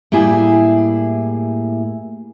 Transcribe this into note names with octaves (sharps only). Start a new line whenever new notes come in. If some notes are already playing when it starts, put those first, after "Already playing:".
A2 G3 A#3 E4 G#4